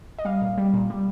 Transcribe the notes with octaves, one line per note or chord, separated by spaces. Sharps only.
D#5
G3 F5
A#2
G3
A#2
G3